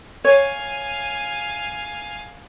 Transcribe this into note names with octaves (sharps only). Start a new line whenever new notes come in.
C#5 F5 G#5